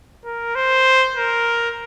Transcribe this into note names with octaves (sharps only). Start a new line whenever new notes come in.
A#4
C5
A#4